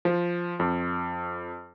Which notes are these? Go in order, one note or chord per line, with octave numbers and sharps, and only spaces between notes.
F3
F2